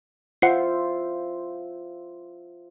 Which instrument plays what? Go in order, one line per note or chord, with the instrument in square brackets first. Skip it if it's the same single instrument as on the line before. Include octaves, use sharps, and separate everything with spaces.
[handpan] F4 C5 E5 [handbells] F#5 C7